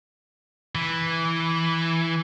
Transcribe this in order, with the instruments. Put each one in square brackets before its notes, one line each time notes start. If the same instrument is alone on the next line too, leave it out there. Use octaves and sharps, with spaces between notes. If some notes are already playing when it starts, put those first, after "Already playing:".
[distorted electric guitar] E3